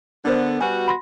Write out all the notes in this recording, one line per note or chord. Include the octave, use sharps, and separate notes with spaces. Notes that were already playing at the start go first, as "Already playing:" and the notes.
D3 B3 D4 A#4 C5
G3 B3 F#4 G#5
B5 C6 A#6